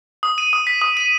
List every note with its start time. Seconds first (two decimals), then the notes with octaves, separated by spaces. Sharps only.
0.23 D#6
0.38 D#7
0.53 D#6
0.67 B6
0.82 D#6
0.97 D#7